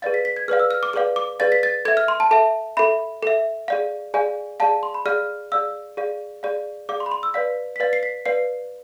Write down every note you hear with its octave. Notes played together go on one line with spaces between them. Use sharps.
G#4 B4 D5 F5 A6
B6
B6
G#6
G#4 B4 D5 F5 F6
E6
F6
D6
G#4 B4 D5 F5 D6
D6
G#4 B4 D5 F5 A6
B6
A6
A4 E5 G#6
F6
C6
A5
A4 E5 A5
A4 E5 B5
A4 E5
G#4 D5 F5
G#4 D5 F5 G#5
G#4 D5 F5 A5
C6
B5
G#4 D5 F5 F6
G#4 D5 F5 E6
G#4 D5 F5
G#4 D5 F5
G#4 D5 F5 D6
C6
B5
C6
E6
B4 D5 F5 B6
B6
B4 D5 F5 A6
C7
B6
B4 D5 F5 C7